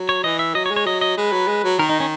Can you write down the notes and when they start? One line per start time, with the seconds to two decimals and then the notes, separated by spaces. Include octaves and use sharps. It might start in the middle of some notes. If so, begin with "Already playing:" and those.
Already playing: F#3
0.09 C#5
0.24 E3 D#5
0.39 E5
0.55 F#3 D#5
0.66 C#5
0.71 G#3
0.76 C#5
0.86 F#3 D#5
1.01 D#5
1.18 G#3 B4
1.32 F#3
1.48 G#3
1.64 F#3
1.79 D#3 A#4
1.89 D#4
2.00 C#4